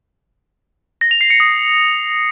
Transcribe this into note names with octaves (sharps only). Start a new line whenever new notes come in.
A#6
F7
C7
C#7
D#6